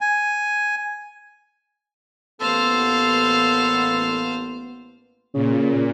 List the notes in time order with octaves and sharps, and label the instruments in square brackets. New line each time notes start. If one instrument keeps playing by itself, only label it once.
[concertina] G#5
[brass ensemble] A1 A#3 B3 [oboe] A4 [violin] C5 F5
[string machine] A#2 [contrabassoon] C#3